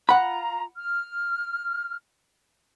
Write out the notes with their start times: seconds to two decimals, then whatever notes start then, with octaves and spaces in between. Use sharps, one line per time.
0.09 F4 F#5 A#5 B5
0.77 F6